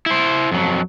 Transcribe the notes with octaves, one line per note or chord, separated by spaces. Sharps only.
E4 C5
F2 F#3